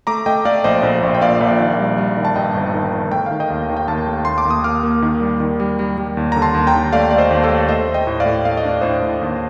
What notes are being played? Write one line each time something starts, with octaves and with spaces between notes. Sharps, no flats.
A3 A#5 D6
A3 D#5 G5
A3 D5 F5
A#1 C5 D#5
A#1 C5 D#5
A#1
G5
A#2 D5 F5
A#1
D#3
G3
G3
D#3
A5
G2 D#5 G5
G1
D#3
D#3
A3 G5
D#3 F5
D#5 G5
D#2
D#3
G5
D#2 F5 A5
A3
D#2 C6
D6
D#2
D#6
A#3 D6 F6
A#3
D#3
G3
D#3
G3
G3
G3
D#2
D3 A#5
A5 C6
D#2
G5 A#5
D#2
A3 D5 F5
A3 D5
C5 D#5
D#2
A4
A3
A3 C5 D#5
A3
D#5 G5
A2
D5 F5
A2
A3 F5
D#5
D4 D5
A2 C5 D#5
A2
D#2